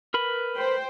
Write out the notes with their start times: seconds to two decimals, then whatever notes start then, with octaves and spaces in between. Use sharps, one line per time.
0.14 A#4 B4 B5
0.56 C5 G5